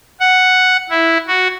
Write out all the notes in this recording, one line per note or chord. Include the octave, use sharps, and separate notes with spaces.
F#5
E4
F#4